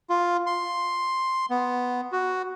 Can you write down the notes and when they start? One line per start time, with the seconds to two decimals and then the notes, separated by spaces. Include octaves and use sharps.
0.10 F4
0.46 C6
1.50 B3
2.12 F#4